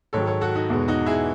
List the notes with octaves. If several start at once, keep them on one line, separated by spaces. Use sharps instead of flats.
G#2 D#3 F#3 A4 C#5
A4 C#5
F#4 A4
D#4 F#4
E2 B2 G#3
D#4 F#4
E4 G#4